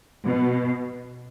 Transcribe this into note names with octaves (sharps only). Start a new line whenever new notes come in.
B2